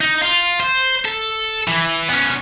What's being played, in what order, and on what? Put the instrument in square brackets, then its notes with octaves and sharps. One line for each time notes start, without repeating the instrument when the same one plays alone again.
[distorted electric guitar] D#4
F4
C5
A4
E3
B3 C#4